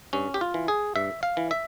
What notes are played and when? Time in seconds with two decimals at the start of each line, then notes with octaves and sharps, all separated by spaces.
0.13 G2 C#4
0.34 G4
0.41 F4
0.54 E3
0.68 G#4
0.96 G2 E5
1.23 F5
1.37 E3
1.51 E5